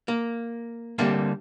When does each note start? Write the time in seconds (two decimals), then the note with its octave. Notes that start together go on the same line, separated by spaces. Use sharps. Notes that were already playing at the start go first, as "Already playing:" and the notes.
0.08 A#3
0.98 D3 G3 A3 A#3 C4